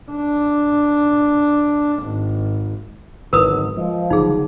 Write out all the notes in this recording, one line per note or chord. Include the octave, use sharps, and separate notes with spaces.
D4
G#1
G#1 G#2 B2 D3 F#3 A#4 B4 D#6
F3 G#3
G1 C#3 F#3 D#4 G#4